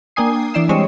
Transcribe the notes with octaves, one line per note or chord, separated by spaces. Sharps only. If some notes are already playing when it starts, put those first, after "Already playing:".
A#3 D4 G5 G#5 D#6 C7
E3 D4 D5 E5 C7 E7
G3 G#3 C4 C#5 D#5